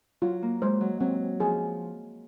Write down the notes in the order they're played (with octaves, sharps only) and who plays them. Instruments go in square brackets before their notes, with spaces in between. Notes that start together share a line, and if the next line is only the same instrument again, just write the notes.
[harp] F#3 [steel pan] F4
[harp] A#3
[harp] G#3 [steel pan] C5
[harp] F#3
[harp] F#3 [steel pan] C4
[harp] F3 [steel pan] G#4